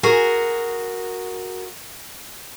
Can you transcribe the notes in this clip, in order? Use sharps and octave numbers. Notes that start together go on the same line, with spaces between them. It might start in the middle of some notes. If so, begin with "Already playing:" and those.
F#4 G#4 A#4